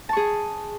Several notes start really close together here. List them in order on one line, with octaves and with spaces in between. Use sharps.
A5 C#6 G#4